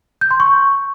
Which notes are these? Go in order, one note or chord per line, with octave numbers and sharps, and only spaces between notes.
G6
C6
C#6